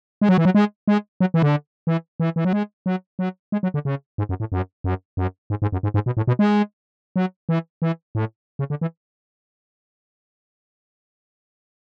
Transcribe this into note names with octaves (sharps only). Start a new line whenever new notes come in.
G#3
F#3
E3
F#3
G#3
G#3
F#3
E3
D3
E3
E3
E3
F#3
G#3
F#3
F#3
G#3
F#3
D3
C#3
G#2
F#2
A2
F#2
F#2
F#2
G#2
G#2
F#2
G#2
G#2
B2
A2
B2
G#3
F#3
E3
E3
A2
C#3
D3
E3